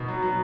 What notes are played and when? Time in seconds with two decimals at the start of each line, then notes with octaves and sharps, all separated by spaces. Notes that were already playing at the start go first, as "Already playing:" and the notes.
Already playing: B2 B3 D#4
0.08 F#3
0.22 F#3